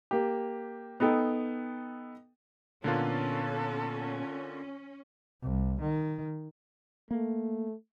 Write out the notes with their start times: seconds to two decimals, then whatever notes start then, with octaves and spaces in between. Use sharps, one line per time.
0.11 A#3 G4
1.00 B3 D#4 A4 G5
2.84 A#2 D3 A#3 B3 C#4 F4 A4
5.42 C2
5.81 D#3
7.11 A3 A#3